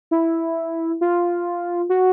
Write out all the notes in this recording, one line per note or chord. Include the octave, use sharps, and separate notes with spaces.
E4
F4
F#4